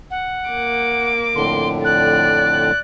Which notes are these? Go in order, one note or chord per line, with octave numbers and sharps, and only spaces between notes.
F#5
A#3 D6
F2 A2 D3 C6
D5 F#6